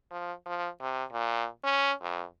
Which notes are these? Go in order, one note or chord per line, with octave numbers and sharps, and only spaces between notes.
F3
F3
C3
A#2
C#4
F2